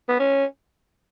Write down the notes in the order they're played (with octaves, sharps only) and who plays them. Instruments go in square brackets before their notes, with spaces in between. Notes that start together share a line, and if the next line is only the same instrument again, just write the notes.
[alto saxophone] B3
C#4